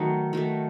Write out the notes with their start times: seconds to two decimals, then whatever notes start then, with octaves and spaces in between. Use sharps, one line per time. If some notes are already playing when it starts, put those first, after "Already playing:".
Already playing: D#3 F#3 A3 D#4
0.33 D#3 F#3 A3